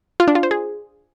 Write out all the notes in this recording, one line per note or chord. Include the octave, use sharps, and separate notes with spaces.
F4
D4
F4
C5
G#4